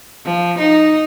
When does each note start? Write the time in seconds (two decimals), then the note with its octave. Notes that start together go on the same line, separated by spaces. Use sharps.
0.25 F3
0.59 D#4